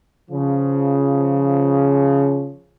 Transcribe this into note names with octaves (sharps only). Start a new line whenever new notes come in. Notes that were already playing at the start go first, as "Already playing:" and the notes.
C#3 F3